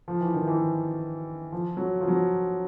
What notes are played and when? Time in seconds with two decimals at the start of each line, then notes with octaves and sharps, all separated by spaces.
0.08 F3
0.21 E3
0.34 D#3
0.47 E3
1.52 F3
1.77 F#3
2.01 F3
2.08 F#3